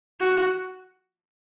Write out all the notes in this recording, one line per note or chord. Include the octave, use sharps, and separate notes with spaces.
F#4